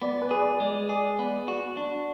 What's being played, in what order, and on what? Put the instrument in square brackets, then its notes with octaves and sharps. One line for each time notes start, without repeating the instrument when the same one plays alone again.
[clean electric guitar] B3 [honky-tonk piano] D5
[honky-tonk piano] B4
[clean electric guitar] G#4
[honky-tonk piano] D5
[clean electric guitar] G#3 [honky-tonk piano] D5
[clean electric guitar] G#4 [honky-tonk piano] D5
[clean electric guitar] B3
F#4
D4